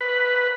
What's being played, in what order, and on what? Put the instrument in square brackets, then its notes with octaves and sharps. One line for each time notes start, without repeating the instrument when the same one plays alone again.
[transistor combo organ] B4